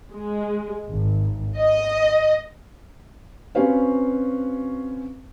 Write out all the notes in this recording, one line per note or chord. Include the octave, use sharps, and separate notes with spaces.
G#3
G#1
D#5
C4 C#4 F#4 B4 F5